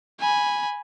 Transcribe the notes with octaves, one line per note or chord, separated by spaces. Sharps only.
G#5 B5